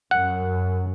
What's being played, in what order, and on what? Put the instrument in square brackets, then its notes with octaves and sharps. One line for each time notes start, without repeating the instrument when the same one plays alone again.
[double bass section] F#2 [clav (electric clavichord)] F#5